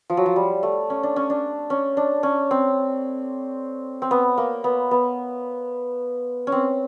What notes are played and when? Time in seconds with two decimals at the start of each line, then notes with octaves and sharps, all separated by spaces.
0.10 F3
0.17 F#3
0.26 F3
0.36 G3
0.63 A3
0.90 C#4
1.03 D4
1.16 C#4
1.30 D4
1.70 C#4
1.97 D4
2.23 C#4
2.51 C4
4.02 C4
4.11 B3
4.38 A#3
4.64 B3
4.91 B3
6.47 C#4
6.52 C4